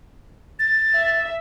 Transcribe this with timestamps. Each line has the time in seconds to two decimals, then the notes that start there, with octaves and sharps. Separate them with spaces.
0.59 A6
0.95 E5